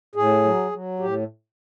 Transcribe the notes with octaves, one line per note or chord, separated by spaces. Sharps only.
A2 G#4
F#3
F#3
A2 G4